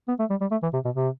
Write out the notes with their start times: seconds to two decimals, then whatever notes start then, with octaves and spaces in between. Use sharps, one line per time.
0.08 B3
0.19 A3
0.30 G3
0.41 G3
0.51 A3
0.63 E3
0.73 C3
0.85 B2
0.95 C3